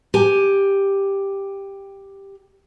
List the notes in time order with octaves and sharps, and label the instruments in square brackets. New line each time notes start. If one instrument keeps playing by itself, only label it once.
[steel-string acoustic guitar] G4 G#5